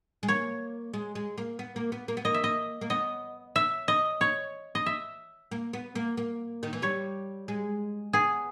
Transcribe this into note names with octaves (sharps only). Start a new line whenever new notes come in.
G#3
A#3 C#5
G#3
G#3
A#3
B3
A#3
B3
A#3
B3
A#3 D#5
E5
D#5
A#3
B3 D#5
E5
D#5
C#5
D#5
E5
A#3
B3
A#3
A#3
D#3
E3
G3 C#5
G#3
B3 G#4